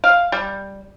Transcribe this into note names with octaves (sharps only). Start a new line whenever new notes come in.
F5
G3